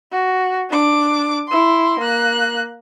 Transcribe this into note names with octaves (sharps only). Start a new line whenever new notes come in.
F#4
D4 D6
E4 C6
A#3 F#6